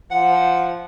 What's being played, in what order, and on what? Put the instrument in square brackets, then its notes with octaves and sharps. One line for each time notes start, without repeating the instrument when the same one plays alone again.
[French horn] F3 [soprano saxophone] F#5